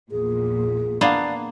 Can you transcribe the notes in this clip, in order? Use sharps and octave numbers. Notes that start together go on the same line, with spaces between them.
A#1 E2 A#2 G#4
A#3 B3 D4 F5